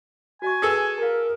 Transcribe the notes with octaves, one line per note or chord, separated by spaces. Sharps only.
F#4 E5 G#5 C#6
G#4 A4 B4
A#4 F5 A5